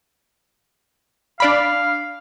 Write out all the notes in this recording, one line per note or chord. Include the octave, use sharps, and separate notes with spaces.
D4 D5 F5 B5